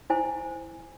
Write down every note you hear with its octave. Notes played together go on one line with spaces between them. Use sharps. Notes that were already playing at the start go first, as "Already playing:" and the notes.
E4 C5 G#5